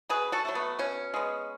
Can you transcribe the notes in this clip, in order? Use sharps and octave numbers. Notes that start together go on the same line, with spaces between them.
B2 G#4 B4
F#4 A4
F#3 A3
B3
B2 C#4
G#3 B3